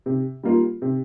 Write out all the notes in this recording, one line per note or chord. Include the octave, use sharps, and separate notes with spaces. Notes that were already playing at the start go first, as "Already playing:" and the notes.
C3
G3 A#3 F4
C3